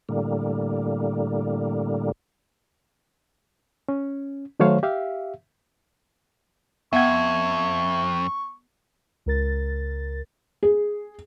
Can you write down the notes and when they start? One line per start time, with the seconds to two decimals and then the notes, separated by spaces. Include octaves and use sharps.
0.09 A2 D3 G3 A#3
3.89 C#4
4.60 D#3 F#3 A3 C5 C#5 F5
4.83 G4 E5 F5
6.93 F2 B3 E5 F#5 C#6 G#6
9.26 C#2 A#4 A6
10.63 G#4